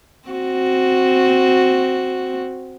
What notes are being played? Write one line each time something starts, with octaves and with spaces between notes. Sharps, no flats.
C4 F#4